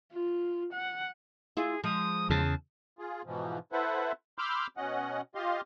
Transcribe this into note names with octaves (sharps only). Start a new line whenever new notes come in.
F4
F#5
E4 F4 G#4
F3 G#3 D#6
E2 C#3 A5
F4 G#4
G#2 B2 E3 F3
E4 A4 B4 C5 E5 F#5
B5 C6 D6 E6 F6 G6
B2 C#4 D#5 F#5
F4 G4 D#5 F5 C6